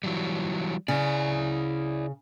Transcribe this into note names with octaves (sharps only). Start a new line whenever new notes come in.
E3 F#3 G3
C#3 E4 D5